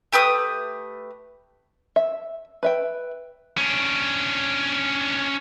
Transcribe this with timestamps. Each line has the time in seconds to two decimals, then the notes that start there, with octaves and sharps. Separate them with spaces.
0.12 A3 G4 B4 D#6
1.96 E5
2.63 B4 E5 G5
3.58 C#4 D4